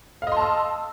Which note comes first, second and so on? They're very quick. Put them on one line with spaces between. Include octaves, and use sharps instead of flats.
F5 D#5 C6 A5 E6